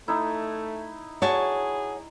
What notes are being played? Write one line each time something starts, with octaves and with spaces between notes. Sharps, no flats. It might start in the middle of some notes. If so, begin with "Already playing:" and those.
A3 D#4 E4
F#4 G#4 C#5 A5 C#6